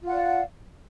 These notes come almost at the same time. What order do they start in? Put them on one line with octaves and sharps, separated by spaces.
F4 F#5 D5 F5